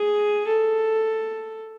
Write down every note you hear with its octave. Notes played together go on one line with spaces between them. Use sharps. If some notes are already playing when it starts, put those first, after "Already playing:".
Already playing: G#4
A4